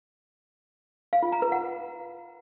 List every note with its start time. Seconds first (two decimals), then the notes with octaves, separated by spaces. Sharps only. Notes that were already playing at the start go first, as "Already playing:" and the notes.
1.13 F5
1.23 F4
1.32 A#5
1.42 B4
1.52 F#5